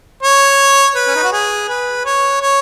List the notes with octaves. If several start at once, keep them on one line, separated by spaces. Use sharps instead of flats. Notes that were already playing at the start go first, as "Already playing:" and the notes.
C#5
B4
C#4
D#4
F#4
G#4
B4
C#5
C#5